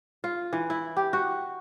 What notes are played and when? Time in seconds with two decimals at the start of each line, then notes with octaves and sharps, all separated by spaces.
0.24 F4
0.53 E3
0.70 E4
0.97 G4
1.13 F#4